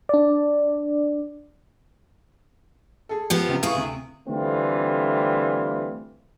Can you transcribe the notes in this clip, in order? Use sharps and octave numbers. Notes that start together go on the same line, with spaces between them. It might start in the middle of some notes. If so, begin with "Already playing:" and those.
D4 D5
G#4 A4
F3 B3 G4
C#2 C3
A3 E4 G#4 F5 C#6
D2 C3
D3 E3 G3 A3 C4 F4